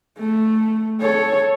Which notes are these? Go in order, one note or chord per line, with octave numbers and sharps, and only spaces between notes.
A3
A4 C#5